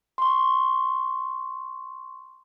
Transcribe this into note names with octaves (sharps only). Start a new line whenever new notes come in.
C6 C#6